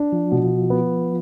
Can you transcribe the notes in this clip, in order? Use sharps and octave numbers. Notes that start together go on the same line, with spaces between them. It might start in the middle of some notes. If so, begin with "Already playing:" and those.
Already playing: D4
F3
B2
B3